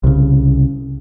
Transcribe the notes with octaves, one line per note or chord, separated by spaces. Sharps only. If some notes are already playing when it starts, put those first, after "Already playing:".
C2 C#3